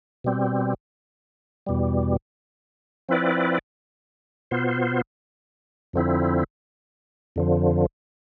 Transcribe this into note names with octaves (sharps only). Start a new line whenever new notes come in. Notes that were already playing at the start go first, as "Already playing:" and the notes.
B2 G3 C4
E2 B2 G3
F3 C4 E4 B4 D5
B2 B3 F4 C5
F2 D3 F3 C4 E4
F2 D3 F3